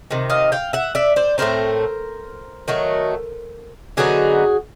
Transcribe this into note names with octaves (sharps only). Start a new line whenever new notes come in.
C3 D#3
D#5 F5
F5 G5
E5 F#5
D5 E5
C5 D5
A2 F#3 A3 C4 A#4 C5
D#3 F#3 A3
D3 F#3 B3 D#4 F#4 G#4